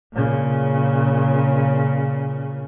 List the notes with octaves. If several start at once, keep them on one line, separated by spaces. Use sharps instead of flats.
A#2 C#3